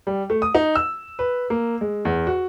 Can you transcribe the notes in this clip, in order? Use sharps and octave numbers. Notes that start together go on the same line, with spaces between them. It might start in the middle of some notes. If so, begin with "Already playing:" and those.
G3
A3
D#6
D#4
E6
B4
A#3
G#3
E2
F#4